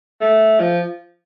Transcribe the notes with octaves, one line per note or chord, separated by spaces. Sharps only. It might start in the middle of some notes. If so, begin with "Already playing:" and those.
A3
F3